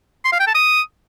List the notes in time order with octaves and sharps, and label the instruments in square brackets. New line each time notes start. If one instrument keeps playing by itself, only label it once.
[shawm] C6
F5
G5
A5
D#6